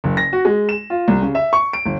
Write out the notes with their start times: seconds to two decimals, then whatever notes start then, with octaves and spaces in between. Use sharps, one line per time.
0.04 F#1
0.17 A#6
0.33 F#4
0.45 G#3
0.69 E7
0.90 F4
1.08 C2
1.22 C#3
1.35 E5
1.53 C#6
1.73 D7
1.86 G1